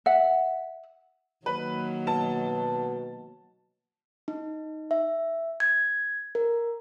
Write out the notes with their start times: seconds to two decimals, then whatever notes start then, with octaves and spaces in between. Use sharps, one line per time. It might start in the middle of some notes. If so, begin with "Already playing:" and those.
0.06 E5 F#5
1.46 D#3 F#3 A#3 B4
2.07 B2 A5
4.28 D#4
4.91 E5
5.60 G#6
6.35 A#4